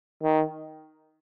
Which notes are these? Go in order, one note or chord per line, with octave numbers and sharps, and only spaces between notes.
D#3